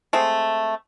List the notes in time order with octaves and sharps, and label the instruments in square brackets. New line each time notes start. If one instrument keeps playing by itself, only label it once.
[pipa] G#3 A3 C4